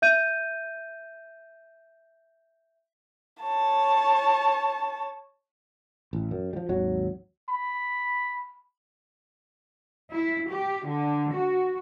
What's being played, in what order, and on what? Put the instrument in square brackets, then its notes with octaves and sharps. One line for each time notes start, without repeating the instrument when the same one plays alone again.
[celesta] E5 G6 D#7
[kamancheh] C#5 A5
[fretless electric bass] A1
F#2
F3 G3
G#1 D#2 F#3
[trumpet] B5
[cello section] E4
G4
D3
F#4